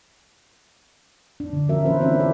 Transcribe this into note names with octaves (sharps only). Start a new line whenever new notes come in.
D4
D3
F3 A#3 C#4 F#4 A#4 E5
E3 C#4 F4 B4 C5
C4 D4 D#4 E5
E4 F#4 A4 D5